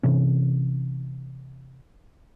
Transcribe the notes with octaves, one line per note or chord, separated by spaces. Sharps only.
C3 E3 C#4